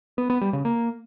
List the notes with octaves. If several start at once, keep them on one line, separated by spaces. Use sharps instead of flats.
B3
B3
G3
C#3
A#3